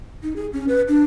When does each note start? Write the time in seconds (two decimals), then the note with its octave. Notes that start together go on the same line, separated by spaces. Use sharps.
0.23 D#4
0.36 G#4
0.53 C#4
0.68 B4
0.88 D4